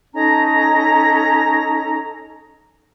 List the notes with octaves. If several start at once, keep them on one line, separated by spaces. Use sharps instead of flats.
C#4 D#4 A4 A#5